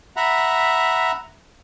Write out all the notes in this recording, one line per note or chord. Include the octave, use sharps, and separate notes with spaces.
E5 F#5 A#5 B5